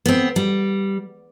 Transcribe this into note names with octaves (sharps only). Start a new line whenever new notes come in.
B3 C4
G3